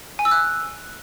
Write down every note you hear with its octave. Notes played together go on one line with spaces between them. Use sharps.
G#5
E6
F#6